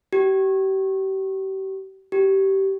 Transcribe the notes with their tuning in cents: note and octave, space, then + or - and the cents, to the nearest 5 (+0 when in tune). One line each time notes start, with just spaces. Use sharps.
G4 -35
G4 -20